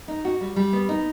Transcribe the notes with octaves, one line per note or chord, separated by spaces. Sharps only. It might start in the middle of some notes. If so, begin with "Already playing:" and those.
D#4
F#4
G3
G3
B3
D#4